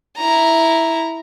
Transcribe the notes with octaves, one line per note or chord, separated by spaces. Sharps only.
E4 A#5